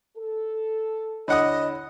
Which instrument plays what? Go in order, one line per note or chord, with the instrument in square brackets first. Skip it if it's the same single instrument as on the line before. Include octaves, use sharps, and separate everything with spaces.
[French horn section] A4
[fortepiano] D3 F#5 D#6 [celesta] E4 C#5 B5 [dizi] D#5